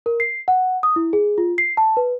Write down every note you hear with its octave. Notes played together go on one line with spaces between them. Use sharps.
A#4
C7
F#5
D#6
E4
G#4
F4
C7
A5
B4